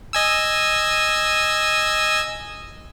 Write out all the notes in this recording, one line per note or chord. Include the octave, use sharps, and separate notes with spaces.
D#5 G#5 E6